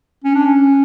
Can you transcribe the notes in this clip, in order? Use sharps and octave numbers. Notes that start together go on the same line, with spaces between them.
C#4
D4
C#4